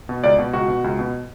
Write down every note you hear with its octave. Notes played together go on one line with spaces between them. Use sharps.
B2
C#2 D5
B2
C#2 F#4
B2
C#2
B2